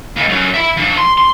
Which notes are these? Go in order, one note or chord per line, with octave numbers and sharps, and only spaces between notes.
D#2 C#3
F#2
E5 B5
F3 D4
C6
C6